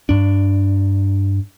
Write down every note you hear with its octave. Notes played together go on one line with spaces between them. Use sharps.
G2 D4